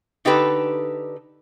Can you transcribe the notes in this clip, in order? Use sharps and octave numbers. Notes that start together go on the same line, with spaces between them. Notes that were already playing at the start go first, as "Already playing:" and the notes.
D3 D#4 G4 A4 B4